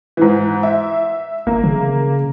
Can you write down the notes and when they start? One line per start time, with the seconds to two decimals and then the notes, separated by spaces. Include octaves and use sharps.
0.17 G#2 E3
0.63 E5
1.47 G1 A#3
1.64 C#3